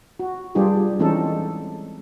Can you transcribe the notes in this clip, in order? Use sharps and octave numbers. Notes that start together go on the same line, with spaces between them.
F#4
G3 D4 F4 G4 G#4
E3 G#3 C4 C#4 D#4 A4